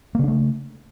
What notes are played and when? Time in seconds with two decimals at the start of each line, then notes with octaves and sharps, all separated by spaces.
0.15 A#3
0.19 C#3
0.24 D4
0.28 A3